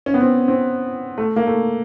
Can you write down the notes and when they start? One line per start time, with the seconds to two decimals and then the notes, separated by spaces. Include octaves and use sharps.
0.06 C#4
0.14 B3
0.21 C4
0.48 C4
1.18 A3
1.36 A#3
1.47 A3